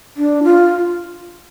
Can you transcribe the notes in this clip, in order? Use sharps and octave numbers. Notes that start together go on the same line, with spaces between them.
D4
F4